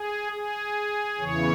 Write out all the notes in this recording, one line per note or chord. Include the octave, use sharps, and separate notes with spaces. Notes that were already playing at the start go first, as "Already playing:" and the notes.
Already playing: G#4
G#4
E2 C#3 E3 C#5